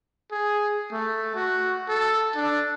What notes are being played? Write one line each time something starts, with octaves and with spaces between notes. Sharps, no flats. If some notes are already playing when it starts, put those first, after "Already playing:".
G#4
A3
F#4
A4
D4